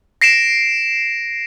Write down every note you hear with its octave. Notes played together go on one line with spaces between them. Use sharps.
A#6 C7 D7 E7